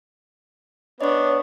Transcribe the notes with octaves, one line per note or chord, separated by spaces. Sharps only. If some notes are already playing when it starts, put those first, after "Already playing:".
B3 D4 C#5 D#5 C#6